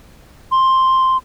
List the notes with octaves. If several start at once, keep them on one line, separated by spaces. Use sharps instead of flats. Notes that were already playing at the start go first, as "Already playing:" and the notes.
C6